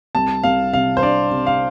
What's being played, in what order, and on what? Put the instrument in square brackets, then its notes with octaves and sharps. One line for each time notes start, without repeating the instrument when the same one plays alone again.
[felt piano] C2 [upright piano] A5
[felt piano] C2 [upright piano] F5
[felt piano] C3 [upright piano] F5
[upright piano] C5
[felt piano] D4 [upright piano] D5
[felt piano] C3
[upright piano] F5